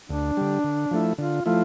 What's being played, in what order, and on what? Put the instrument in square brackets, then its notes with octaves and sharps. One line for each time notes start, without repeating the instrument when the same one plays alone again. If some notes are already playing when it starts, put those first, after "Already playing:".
[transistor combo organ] D2 [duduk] D4
[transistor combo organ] D3 G3
D3
F3 A3 E4
[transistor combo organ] D3 [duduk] F4
[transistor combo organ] F3 A3 E4 [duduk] F4